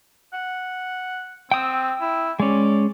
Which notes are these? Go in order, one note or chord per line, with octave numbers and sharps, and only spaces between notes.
F#5
C4 G5 D#6 E6
E4
G#3 C#4 D5